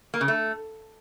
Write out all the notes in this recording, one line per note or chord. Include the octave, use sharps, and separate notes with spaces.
A#3
C#3
A3